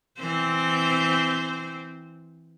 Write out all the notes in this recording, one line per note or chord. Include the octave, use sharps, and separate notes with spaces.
E3 C4 C5